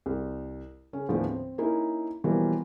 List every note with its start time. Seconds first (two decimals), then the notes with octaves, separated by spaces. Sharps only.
0.06 C2
0.93 C#3 C#4
1.09 D#2 A2 D3 F3 B3 C#4
1.26 C4
1.58 A#3 C#4 D#4 E4
2.24 B2 E3 F3 G3 A#3